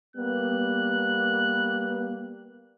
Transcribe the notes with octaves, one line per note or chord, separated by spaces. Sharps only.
G3 A#3 B3 F#6